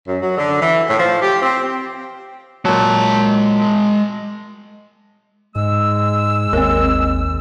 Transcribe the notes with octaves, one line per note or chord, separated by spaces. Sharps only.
F#2
F#3
D3
E3
A2
F3
G4
C4
A#2 F#3 G#3 A5
G#2 G#3 E6
G#1 D#2 C4 A#4